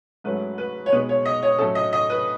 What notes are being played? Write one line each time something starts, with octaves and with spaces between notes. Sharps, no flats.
G#2 F#3 A3 C#4 B4
B4
C#5
B2 G#3 B3 B4
C#5
D#5
C#5
A2 F#3 A3 C#4 A4
D#5
D#5
B4